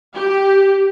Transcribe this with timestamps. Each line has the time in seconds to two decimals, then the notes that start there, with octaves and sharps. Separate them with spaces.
0.14 G4